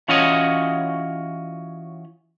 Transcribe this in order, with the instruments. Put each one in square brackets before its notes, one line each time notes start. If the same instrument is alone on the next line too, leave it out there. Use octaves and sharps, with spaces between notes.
[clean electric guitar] E3 C#4 F4 F#4 C#5 D#5